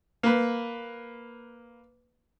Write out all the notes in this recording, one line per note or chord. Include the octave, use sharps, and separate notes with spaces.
A#3 B4